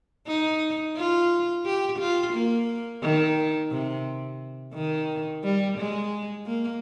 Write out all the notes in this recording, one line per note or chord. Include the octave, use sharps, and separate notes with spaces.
D#4
F4
G4
F4
A#3
D#3
C3
D#3
G3
G#3
A#3